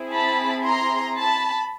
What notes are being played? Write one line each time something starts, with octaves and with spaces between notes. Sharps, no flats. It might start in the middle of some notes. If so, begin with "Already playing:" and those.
Already playing: C4 E4 G#4
A5 B5
A#5 C6
A5 B5